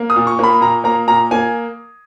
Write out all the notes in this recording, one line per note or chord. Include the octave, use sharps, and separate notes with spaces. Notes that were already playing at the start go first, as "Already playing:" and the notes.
Already playing: A#3
D#6
A#2
C#6
A#3 B5
A#2 A#5
A#3 A#5
A#2 A#5
A#3 G#5